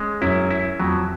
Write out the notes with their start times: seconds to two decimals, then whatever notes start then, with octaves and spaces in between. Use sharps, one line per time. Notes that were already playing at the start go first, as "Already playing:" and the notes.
Already playing: G#3 C#4
0.21 F#2 E4
0.51 E4
0.79 F2 F#3